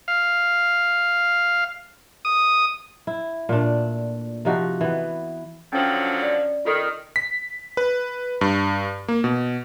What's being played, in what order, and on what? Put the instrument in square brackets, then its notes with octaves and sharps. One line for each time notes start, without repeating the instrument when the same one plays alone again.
[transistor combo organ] F5
D#6
[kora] E4
A#2 A3 D4
C3 F3 D#4 F#4
E3 B3
[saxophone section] D3 F3 F#3 [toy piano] C#4
[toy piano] D5
[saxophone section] D#3 [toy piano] F4 A4
[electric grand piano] B6
B4
G2
A#3
B2